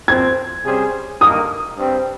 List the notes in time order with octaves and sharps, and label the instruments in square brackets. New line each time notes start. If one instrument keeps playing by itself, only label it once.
[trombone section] A#2 F3 C4 [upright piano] G#6
[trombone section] C3 G3 C#4 G#4 C5
[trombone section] G2 D#3 A#3 D#4 A#4 [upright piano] D#6
[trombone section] G2 G3 C4